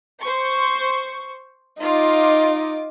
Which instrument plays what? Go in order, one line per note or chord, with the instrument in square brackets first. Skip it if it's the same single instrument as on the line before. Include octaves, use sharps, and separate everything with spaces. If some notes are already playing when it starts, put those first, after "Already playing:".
[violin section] C5 C#6
[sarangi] D#4 [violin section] F4 D6